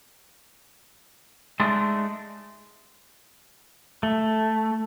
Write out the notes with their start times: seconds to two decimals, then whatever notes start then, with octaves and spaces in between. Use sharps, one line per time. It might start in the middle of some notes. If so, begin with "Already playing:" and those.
1.60 G#3 A3 D4 D#4
4.03 A3